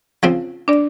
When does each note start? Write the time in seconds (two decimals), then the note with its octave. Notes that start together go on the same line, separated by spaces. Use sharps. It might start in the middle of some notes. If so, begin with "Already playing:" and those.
0.23 C#3 F3 C4
0.68 D4 D5